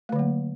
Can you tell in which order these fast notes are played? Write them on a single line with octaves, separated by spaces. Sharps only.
A3 D3 F#3 A#3